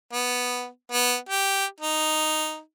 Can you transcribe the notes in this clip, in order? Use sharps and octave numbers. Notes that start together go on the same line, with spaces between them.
B3
B3
G4
D#4